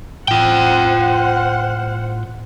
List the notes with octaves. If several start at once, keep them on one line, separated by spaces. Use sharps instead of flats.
A2 F4 C5 F#5 G5